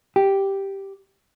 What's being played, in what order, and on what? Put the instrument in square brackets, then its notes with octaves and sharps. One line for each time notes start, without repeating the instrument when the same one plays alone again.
[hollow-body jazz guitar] G4